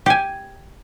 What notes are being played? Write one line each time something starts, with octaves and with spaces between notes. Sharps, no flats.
G4 G#5